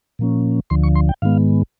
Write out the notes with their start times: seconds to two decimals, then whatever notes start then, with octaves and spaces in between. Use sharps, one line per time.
0.19 A#2 F3 A#3 C#4
0.70 D2 D3 F3 C6
0.83 C#6
0.95 C6
1.09 G5
1.22 G#2 D#3 G#3 B3 F5